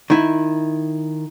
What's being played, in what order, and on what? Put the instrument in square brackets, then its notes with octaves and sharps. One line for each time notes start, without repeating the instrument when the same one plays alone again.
[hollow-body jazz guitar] D#3 E4